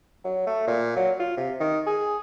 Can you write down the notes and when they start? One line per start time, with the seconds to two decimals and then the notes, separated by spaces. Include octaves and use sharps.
0.24 F#3
0.47 A3
0.67 A#2
0.96 F#3
1.19 F4
1.37 C3
1.60 D#3
1.86 G#4